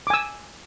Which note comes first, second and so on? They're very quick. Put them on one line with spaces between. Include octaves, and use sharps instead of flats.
D6 G#5 E6